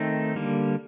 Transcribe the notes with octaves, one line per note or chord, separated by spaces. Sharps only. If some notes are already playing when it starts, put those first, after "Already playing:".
Already playing: D#3 A3 C4 D#4
D3 G3 A#3